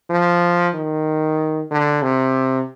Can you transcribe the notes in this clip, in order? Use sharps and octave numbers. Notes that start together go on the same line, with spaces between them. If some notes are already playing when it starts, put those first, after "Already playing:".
F3
D#3
D3
C3